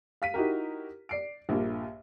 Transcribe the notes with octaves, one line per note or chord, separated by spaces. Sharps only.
F5 B6 D#7
D#4 E4 F#4 G4 A#4
D5 C7 D7
A#1 G2 A#3